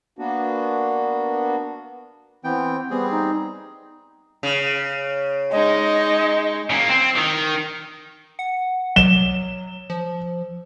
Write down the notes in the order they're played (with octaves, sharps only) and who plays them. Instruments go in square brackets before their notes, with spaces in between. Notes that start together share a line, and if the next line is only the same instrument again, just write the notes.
[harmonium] A#3 B3 D4 F#4
[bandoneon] E3 B3 G5 [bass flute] C4
[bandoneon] G3 C4 G#4 [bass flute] B3
[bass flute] D#4
[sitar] C#3
[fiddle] G#3 D#4 [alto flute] D#5
[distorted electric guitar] C#3 A#3
C4
D#3
[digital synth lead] F#5
[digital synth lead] F#3 [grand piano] E7 G7
[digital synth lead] F3